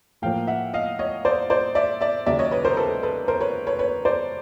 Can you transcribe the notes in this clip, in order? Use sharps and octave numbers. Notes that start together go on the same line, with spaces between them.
A2 F3 A#3 F5 G5
E5 F#5
D#5 F5
C#5 D#5
C5 D5
C5 D5
D5 E5
D5 E5
D#2 C#3 F#3 D5 E5
C#5 D#5
B4 C#5
A#4 C5
A4 B4
A4 B4
A#4 C5
B4 C#5
B4 C#5
B4 C#5
C5 D5